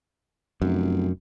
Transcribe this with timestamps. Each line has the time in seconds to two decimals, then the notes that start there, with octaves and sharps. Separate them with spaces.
0.62 F1 F#2